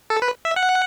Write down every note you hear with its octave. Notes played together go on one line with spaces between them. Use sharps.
A4
B4
E5
F#5